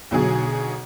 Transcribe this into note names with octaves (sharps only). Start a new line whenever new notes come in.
B1 B2 D3 F#3 G#4